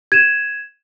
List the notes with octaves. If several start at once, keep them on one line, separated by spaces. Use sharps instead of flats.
G#6 D#7 E7